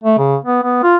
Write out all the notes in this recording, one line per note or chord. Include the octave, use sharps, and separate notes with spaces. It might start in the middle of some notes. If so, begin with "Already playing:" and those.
A3
C#3
B3
B3
F4